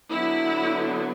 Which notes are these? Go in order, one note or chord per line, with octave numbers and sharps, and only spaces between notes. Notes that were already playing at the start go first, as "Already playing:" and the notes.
D3 F#3 B3 E4